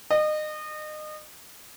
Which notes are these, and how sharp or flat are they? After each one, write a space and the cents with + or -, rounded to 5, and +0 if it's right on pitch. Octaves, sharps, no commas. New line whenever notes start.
D#5 -30